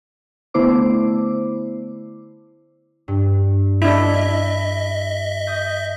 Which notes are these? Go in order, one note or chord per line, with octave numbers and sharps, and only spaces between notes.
D3 A3 B3 E4 C5 D6
G2
D4 E4 D#5 E5
D#6 G6